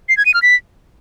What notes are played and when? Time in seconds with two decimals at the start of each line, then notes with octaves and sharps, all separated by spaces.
0.09 C7
0.17 G#6
0.26 D#7
0.34 F6
0.42 B6